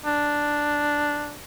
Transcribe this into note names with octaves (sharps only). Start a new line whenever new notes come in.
D4